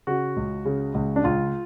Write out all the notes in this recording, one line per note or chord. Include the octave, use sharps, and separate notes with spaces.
C#3 F#4
C#2
C#3
C#2
D4
C#2 F4